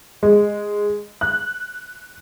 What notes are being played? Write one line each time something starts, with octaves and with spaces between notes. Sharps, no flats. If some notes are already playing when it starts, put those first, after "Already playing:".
G#3
F#6